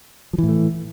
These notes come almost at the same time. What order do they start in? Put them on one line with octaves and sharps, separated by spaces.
F3 E3 A2 A3